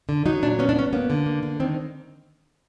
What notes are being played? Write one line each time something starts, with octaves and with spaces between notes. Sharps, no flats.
D3
F#3 D#4
A#2 D4
B3 C#4
D4
B3 C#4
A#3 B3
D3
A#3
D3
D#3 C4